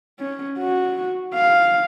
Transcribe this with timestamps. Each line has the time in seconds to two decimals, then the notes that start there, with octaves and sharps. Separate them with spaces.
0.19 C#4
0.58 F#4
1.34 F5